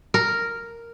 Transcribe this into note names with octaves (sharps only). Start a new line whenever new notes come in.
A#4